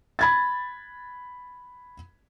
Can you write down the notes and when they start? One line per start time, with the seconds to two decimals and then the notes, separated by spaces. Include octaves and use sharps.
0.19 B5 G#6 A6